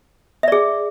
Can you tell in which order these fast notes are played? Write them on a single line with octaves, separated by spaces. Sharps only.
E5 D5 G#4